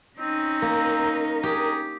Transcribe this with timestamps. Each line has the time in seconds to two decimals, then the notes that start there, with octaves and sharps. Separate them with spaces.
0.19 C4 C#4 D#4
0.62 A#3 A#4
1.43 G4 G#4